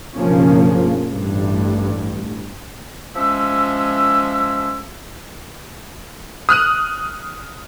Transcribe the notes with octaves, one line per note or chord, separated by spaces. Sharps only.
B1 G2 C#3 F3 A#3 C#4
A1 G2
F3 G#3 C#4 E5 E6
D#6 F6 F#6 D#7